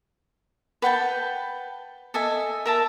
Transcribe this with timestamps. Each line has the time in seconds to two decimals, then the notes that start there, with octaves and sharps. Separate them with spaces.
0.82 B4 F#5 G5 A5
2.14 A4 D#5 E5 G#5
2.66 A#4 E5 A5